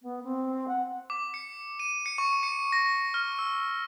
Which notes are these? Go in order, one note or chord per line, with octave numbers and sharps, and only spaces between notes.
B3
C4
F#5
D6
C#7
D#7
C#7
C#6
C#7
A#6
F6
E6